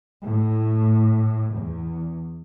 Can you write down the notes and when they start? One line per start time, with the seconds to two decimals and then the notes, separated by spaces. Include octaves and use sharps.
0.25 A2
1.55 E2